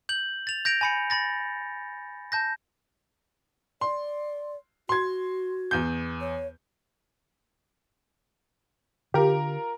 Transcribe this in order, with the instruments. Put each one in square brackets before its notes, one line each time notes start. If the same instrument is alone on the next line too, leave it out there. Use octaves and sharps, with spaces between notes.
[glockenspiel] G6 F#7
A6 F7
G6 A#6 D7 F7
G#5 B5 C#7
B5 A6 A#6
A5 G6 A#6
[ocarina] D5 [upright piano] C6
[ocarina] F#4 [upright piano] C6 G#6
[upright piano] E2 G6
[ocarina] C#5
[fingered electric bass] D3 [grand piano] F4 A#4 [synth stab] G4